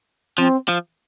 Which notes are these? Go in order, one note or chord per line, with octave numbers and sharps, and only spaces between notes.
F3 C4
F3